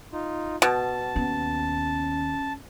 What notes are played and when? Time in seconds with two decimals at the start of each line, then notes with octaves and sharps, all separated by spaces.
0.13 D#4 F4
0.62 B2 A5
1.16 D#2 B3 C#4